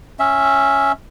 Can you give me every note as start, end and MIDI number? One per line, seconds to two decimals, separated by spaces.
0.19 0.92 61
0.19 0.92 76